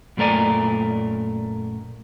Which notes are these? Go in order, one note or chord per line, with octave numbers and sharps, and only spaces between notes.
F#2 A#2 A3 A#4 D5 G#5